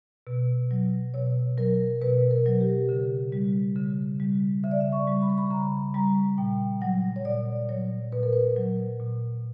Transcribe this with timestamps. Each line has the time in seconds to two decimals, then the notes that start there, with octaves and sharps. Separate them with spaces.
0.27 B2
0.71 F#3
1.14 B2 C#5
1.57 F#3 A#4
2.02 B2 B4
2.31 A#4
2.46 F#3
2.60 G4
2.89 C#3
3.32 G3
3.76 C#3
4.20 G3
4.64 C#3 E5
4.71 D5
4.81 E5
4.92 C#6
5.07 G3
5.22 B5
5.30 C#6
5.38 B5
5.51 C#3 A#5
5.94 G3 A#5
6.38 A#2 G5
6.81 F#3 F#5
7.16 C#5
7.25 A#2 D5
7.69 F#3 C#5
8.12 A#2 B4
8.23 A#4
8.33 B4
8.56 F#3
9.00 A#2